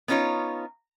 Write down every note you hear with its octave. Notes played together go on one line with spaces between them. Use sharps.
B3 C#4 D#4 F4 C#5